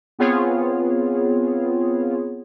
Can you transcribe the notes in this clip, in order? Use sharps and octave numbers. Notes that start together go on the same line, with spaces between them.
B3 C4 F4 G#4 C#5